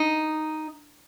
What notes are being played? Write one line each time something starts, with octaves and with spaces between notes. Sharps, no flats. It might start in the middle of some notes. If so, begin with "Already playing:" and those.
Already playing: D#4